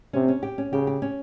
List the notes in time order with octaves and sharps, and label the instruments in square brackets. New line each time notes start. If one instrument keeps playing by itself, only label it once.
[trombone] C3 [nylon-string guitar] C#4
[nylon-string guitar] C#4
G4
C#4
[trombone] C#3 [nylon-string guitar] G4
[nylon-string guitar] G4
C#4